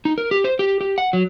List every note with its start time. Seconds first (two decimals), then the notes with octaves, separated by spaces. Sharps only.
0.05 D#4
0.18 A#4
0.31 G4
0.44 C5
0.59 G4
0.81 G4
0.98 F#5
1.13 F#3